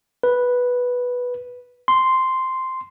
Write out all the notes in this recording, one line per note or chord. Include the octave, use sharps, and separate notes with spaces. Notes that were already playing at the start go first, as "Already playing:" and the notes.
B4
C6